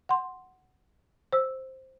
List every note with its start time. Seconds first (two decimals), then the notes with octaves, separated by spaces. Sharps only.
0.09 F#5 C6
1.33 C5 E6